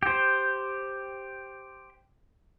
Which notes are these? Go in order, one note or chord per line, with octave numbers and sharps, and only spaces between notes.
G4 C5